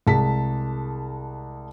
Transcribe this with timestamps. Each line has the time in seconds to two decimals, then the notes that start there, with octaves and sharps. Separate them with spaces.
0.07 C2 G#3 A5 B6